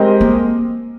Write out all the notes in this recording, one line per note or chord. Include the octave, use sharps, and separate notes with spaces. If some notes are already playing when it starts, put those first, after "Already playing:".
Already playing: G#3 C4 G4 A#4 D#5
A#3